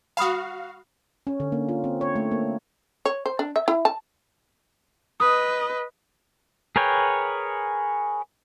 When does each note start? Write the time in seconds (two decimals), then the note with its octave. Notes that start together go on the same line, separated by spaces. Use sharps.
0.17 F#4 F5 A#5 B5 D#6
1.27 C#4
1.40 D3
1.52 A#3
1.69 F4
1.84 C4
2.01 C#5
2.16 A3
2.31 A#3
3.06 C#5
3.26 C5
3.39 D4
3.56 E5
3.68 E4
3.85 A5
5.20 B4 D#5 D#6
6.76 G#4 A#4 B4 C#5 G5